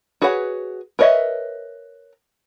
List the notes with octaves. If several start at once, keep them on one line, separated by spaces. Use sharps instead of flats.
F#4 G#4 B4 C#5 F#5
A#4 B4 C#5 D#5 E5